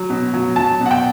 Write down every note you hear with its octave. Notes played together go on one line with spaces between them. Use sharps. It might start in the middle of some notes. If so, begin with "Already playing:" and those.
Already playing: F#3
B2
F#3
F#3 A5
B2
F#5
G5